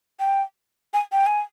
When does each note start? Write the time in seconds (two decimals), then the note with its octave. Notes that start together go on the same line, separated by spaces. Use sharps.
0.19 G5
0.94 G#5
1.12 G5
1.26 G#5